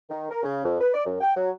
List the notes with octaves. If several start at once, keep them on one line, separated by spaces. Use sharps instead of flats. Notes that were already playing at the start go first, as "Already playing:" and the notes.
D#3
A#4
C#3
F2
B4
D5
F#2
G5
F#3